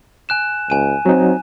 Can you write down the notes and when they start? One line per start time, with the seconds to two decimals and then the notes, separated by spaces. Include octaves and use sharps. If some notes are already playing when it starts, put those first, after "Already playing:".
0.29 G#5 F#6 E7
0.70 C#2 G#5 D#7
1.06 F#3 C4 D#4